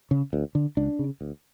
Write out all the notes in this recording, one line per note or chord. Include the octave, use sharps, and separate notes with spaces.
C#3
D2
D3
C#2 D4
C#3
D2